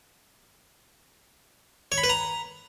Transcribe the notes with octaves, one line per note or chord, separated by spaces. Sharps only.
C#5
B5
B4
A#5